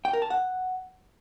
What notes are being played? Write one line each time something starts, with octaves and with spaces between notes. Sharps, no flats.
G5
A#4
A5
F#5